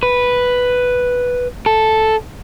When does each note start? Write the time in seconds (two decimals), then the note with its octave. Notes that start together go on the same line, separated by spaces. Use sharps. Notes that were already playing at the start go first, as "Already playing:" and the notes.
0.03 B4
1.66 A4